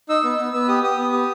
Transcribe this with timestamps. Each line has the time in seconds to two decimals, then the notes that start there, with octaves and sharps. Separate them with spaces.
0.09 D#4 E6
0.24 B3
0.39 B3
0.54 B3 E6
0.68 G4 D#6
0.83 G4 D#6
0.98 B3
1.13 G4